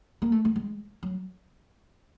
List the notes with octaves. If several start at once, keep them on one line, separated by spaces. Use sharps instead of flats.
A#3
A3
A3
G#3
F#3